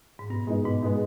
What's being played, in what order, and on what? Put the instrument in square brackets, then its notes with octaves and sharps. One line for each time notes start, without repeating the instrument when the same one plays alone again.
[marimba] G#2
[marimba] G2 [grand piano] B2
[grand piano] G#3 B3 D#4
[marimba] G#2 [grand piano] B2
[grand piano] G#3 B3 D#4